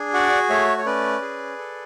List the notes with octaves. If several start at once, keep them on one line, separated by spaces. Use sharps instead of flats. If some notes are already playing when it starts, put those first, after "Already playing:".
Already playing: D4 G#4
F#4 D5 F#5
A3 C#5 E5
C#5
C#4 B4 D5
G#4
A4